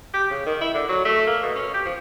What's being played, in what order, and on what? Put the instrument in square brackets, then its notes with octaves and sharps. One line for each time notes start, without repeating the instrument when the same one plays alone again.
[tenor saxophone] G4
C#3
D#3
E4
D3
F#3
A3
A#3
B2
C#4
G4
F3